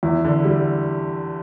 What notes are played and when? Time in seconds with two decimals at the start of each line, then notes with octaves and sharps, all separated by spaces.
0.03 E2 E4
0.24 D3
0.44 G3